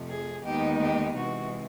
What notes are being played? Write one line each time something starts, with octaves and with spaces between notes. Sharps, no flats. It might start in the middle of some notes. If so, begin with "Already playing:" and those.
Already playing: F2 C3 F3 A3
G#4
D#2 D#3 G#3 B3 D#4 G4
G4
C3 E3 G#3 F#4